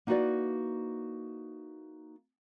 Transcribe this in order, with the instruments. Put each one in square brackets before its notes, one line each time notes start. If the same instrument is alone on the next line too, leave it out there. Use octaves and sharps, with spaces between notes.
[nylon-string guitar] A#3 D#4 E4 F#4 B4 D5